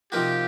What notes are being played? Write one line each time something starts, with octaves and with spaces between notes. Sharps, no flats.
C3 F3 A#3 D#4 F#4 G4